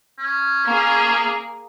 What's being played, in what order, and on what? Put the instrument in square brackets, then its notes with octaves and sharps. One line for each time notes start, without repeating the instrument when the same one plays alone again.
[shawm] C#4
[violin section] A#3 G#4